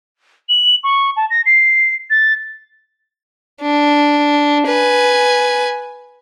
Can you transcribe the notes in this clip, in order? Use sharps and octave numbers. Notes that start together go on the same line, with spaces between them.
F#7
C#6
A5
A#6
C7
A6
D4
B4 G#5